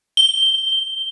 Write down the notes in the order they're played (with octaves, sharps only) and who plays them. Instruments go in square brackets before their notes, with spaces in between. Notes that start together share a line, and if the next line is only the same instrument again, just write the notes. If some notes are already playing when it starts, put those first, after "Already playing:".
[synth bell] G7